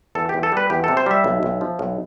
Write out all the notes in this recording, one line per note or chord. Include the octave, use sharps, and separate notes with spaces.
E2 A4
G4
E2
A4
G3 B4
E2 G4
C3 A4
C5
G3 E5
B1
B1
F3
B1